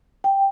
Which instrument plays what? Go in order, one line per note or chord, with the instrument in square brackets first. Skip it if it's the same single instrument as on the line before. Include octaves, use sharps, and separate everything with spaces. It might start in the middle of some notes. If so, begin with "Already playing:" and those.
[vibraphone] G5